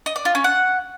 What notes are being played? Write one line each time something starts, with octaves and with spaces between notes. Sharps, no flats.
D#5
D5
F4
C#4
F#5